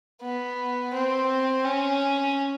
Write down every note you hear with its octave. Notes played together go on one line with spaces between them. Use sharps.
B3
C4
C#4